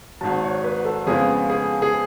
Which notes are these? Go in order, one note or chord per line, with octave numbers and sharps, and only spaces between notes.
G#1 G#2 F#3 A5
C#5
B4
A4
F2 C#3 G#3 B3 F4 G#4
G#4
G#4